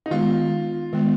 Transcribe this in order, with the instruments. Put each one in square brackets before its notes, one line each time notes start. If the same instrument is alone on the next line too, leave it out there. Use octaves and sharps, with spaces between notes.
[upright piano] D#4
[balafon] D#3 G#3 B3 [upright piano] F4
[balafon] D#3 G#3 B3